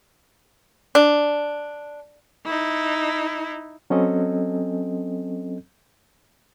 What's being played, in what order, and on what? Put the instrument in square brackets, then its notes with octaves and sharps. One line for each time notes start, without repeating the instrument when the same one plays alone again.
[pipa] D4
[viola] D#4 E4
[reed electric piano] F#3 C4 C#4 A4 D#5